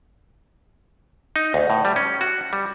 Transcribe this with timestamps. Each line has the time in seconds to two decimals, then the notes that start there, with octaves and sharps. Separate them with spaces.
1.36 D#4
1.54 D2
1.70 A2
1.85 G3
1.96 C#4
2.21 F#4
2.53 G3